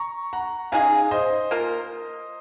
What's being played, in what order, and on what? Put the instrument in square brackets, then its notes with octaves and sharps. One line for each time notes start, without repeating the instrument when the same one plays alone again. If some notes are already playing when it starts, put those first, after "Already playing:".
Already playing: [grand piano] A#5 C#6
F#5 A#5
[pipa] C#3 G#3 D#4 G#4 [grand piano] F5 G#5
[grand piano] C5 D#5
[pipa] A#3 F4 A#4